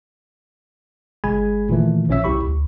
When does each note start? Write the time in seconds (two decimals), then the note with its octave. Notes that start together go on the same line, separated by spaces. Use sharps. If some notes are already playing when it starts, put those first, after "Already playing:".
1.24 G1 G#3 G#4 G#5 B5 G#6
1.69 A#2 D#3 E3 A3
2.09 A#1 F3 C#4 C#5 E5 E6
2.24 C2 E4 G4 B5 C#6
2.43 D2